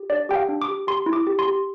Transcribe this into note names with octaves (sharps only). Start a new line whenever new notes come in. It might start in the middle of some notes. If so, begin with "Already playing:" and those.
Already playing: G4
D4 D5
G4 G5
F5
D4
D6
G4
G4 C6
E4
D6
G4
C6
G4